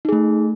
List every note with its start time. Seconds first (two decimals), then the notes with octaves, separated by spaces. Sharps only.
0.05 D#4
0.09 G#4
0.12 A3